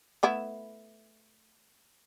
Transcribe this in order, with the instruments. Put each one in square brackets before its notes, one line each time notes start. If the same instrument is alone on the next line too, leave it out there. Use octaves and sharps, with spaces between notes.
[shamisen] A3 B3 E4